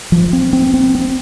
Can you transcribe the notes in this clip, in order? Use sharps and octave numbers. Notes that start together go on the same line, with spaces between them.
F3
C4
C4
C4
C4